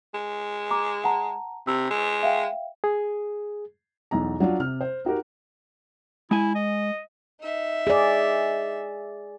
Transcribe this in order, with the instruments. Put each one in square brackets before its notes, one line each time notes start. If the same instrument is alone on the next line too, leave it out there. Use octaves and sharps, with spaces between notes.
[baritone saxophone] G#3
[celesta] A#5 D6
F#5 A5 A#5
[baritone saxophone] C3 [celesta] E6
[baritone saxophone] G#3
[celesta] E5 F5 G5
[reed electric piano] G#4
[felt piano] B1 E2 A#5
F#3 D4 F4
C3 F6
C5
D#4 F#4 G4 A#4
[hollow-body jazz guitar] G#3 G#5 [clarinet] E4
[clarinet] D#5
[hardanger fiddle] D#4 E5
[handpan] G#4 D5